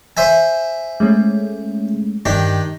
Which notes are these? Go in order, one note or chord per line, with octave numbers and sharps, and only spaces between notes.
C5 E5 G#5
G#3 A3 C#4
G2 D#3 D4 G4